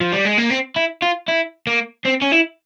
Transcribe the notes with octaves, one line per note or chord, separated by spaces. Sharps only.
F3
G3
G#3
A#3
C4
E4
F4
E4
A#3
C4
C#4
E4